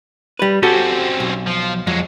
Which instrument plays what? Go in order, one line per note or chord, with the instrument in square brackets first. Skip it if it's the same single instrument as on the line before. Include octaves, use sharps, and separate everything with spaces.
[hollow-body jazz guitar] G3 B4
[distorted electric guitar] C4 C#4 [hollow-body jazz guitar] F#4 G4 A4
[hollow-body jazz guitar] B1
[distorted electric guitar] F3
[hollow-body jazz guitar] F2 [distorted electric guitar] F#3 G#3